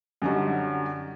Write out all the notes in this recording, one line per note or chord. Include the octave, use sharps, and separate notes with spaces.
F#2 D3 F#3 G3 D#4